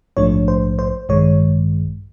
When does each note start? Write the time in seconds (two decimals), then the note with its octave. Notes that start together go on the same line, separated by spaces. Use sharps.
0.17 A#1 G#2 F3 A3 D4 C#5
0.48 C5
0.79 C5
1.09 A1 G2 D#3 G#3 C#5